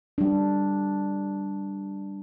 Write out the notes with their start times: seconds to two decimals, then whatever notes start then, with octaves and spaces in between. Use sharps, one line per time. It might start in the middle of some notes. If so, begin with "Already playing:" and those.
0.18 G3 D4